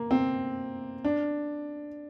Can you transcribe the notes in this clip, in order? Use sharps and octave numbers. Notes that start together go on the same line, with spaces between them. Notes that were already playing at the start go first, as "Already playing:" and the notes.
Already playing: A#3
C4
D4